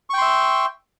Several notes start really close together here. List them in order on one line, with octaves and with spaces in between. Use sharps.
C#6 G5 C6 E5